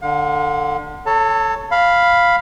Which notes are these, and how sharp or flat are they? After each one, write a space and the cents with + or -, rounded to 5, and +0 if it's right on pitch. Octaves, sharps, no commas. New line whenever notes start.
D3 +20 F5 +40
A4 -5 C#5 +0 A5 +35
F5 +0 B5 +0